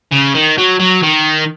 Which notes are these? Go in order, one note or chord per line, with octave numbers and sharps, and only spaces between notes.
C#3
D#3
F#3
F#3
D#3